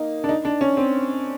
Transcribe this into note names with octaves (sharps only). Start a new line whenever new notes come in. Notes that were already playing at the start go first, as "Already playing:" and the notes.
Already playing: A#3 D#4
D4
D#4
D4
C#4
C4